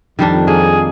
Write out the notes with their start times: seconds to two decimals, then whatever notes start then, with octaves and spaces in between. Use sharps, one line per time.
0.19 F2 D#3 G3 D4
0.47 A#3 G#4